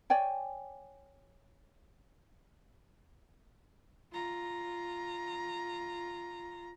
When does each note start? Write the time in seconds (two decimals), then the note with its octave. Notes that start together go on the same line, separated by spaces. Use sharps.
0.10 C#5 D5 G5 G#5
4.12 F4 A#5